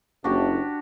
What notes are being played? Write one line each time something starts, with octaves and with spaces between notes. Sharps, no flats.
F#1 D4 F#4 G4